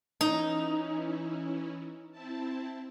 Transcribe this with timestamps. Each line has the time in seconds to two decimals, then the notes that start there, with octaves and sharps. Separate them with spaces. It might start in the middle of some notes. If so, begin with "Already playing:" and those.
0.21 E3 C#4 D#4 E4
2.12 C4 E4 A5